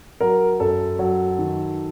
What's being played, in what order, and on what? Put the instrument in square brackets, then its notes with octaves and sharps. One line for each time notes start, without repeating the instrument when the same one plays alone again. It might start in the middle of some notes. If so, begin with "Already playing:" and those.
[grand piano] F#3 A#4
F#2 A4
F#3
D#3